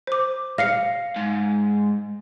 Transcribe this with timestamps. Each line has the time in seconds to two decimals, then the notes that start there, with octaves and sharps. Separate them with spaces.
0.07 C5 D6
0.58 F5 A#6 C7 C#7
1.16 G#2